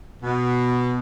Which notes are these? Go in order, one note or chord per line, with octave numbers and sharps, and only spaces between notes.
B2